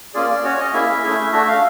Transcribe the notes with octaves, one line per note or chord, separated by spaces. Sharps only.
A#3 C#4 F4 G#4 D5
C#4 F#4 C#5
D#5
A#3 C#4 E4 G#4 E5
A3 C#4 E4 G#4
A3 D4 F#4 E5
F5